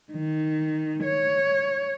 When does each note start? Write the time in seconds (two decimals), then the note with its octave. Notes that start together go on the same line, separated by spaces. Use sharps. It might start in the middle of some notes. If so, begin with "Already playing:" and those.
0.12 D#3
1.03 C#5